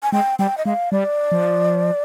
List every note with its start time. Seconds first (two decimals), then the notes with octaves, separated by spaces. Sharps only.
0.03 G#5
0.12 G#3 G5
0.39 G3 G5
0.58 D#5
0.66 G#3 F5
0.92 G3 D5
1.32 F3